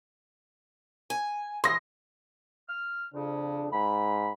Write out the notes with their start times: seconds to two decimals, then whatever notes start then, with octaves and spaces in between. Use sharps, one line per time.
1.10 G#5
1.64 E3 C6 D#6 A#6
2.69 F6
3.14 F2 C#3 D4
3.72 G#2 B5